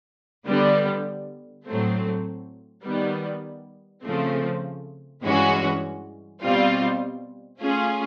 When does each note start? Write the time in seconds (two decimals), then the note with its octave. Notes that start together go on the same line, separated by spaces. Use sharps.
0.47 D3 G3 B3
1.66 A2 F#3 A3 C4
2.84 D#3 G3 B3
4.04 C#3 F3 A3 C4
5.23 G2 E3 G#3 C#4 F#4
6.42 B2 G3 C4 F4
7.61 A3 C#4 F4 G#4